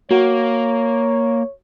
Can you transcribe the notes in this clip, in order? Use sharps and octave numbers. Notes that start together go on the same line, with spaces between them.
A#3 F#4 C#5